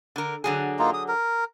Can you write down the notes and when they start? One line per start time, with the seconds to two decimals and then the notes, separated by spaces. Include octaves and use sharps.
0.16 D3 A#4
0.44 D3 F#3 G#4
0.79 A#3 D#4 F4
0.94 D#6
1.08 A#4